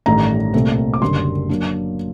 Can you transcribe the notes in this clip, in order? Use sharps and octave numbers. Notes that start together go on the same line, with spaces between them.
A1 G2 D#3 A3 D4 A#5
C2 A#2 A3 C4
D6
F#1 F#2 D3 G3 C6
F#3 A#3 D4